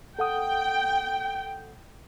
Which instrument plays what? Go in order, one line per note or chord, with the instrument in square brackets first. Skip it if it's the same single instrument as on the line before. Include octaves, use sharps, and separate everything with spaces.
[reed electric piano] A4 F#5 D#6 [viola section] G5